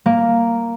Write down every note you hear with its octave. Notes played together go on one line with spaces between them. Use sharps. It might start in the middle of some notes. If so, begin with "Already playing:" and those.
A#3